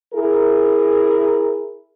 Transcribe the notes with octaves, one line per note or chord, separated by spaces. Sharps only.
E4 G#4 A#4